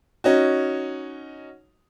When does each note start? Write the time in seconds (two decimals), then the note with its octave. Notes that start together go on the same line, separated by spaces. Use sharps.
0.24 C#4 D#4 F#4